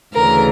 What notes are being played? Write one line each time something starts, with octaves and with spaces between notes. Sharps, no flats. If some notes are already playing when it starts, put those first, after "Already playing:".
D2 C#3 E3 A#4